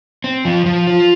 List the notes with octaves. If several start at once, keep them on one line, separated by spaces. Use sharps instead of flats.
C4
F3
F3
F4